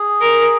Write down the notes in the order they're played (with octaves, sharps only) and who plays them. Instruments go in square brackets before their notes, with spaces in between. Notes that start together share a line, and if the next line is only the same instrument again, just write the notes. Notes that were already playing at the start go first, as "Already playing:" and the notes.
Already playing: [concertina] G#4
[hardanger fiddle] A#4